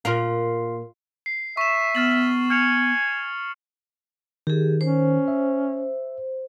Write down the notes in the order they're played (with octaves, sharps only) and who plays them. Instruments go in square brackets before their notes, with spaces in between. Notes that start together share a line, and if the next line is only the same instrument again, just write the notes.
[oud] A#2 A#4 [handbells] F4 F5
[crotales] C7
[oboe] E5 [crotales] C#6 E7
[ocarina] B3 [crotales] F6 A6 F#7
[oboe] G#5 [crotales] F6 C#7 F7
[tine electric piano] D#3 [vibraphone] G4 G#4
[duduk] C#4 [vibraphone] C5
[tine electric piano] E5